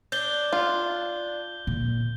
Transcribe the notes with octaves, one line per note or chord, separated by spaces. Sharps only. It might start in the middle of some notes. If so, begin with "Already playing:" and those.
D4 G6 G7
F4
A#2 D3